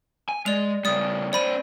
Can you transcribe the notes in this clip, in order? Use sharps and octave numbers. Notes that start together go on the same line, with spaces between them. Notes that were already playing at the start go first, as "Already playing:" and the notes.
G#5
G#3 D5 F7
C#3 G3 D5 D#6
C#4 C5 D5 B5 D#7